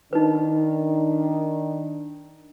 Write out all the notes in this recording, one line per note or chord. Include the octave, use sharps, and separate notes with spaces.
D#3 D4 D#4 B4